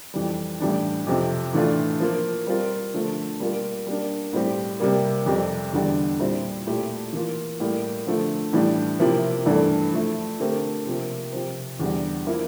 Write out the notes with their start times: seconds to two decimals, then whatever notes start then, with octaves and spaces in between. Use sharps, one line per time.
0.14 F2 E3 G3
0.60 A2 E3 G3 D4
1.07 F2 C3 F3
1.53 A2 E3 A3 D4 F4
2.00 F3 A#3 F4
2.47 G3 C4 F4 A#4
2.94 D3 F3 A3
3.40 G3 A#3 F4 A#4
3.87 G3 A#3 D4
4.33 A2 G3 C4 G4
4.80 C3 G3 A#3
5.26 F2 C3 G3
5.73 E2 D3 G3
6.20 A#2 G3 C4 E4
6.67 A#2 A3 E4 G4
7.13 E3 A#3 F4
7.60 A2 G3 A#3
8.07 D3 F3 A3
8.53 A2 E3 G3 D4
9.00 C3 F3 A#3 E4
9.46 G2 E3 A3 D4 A4
9.93 F3 A3 E4
10.39 D3 A3 C4 G4 A#4
10.86 C3 F3 A#3
11.32 C3 F3 C4
11.79 E2 D3 G3
12.26 F3 A#3 E4